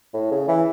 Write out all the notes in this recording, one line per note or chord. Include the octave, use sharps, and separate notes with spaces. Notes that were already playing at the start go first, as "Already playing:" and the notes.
A2
C#3
E3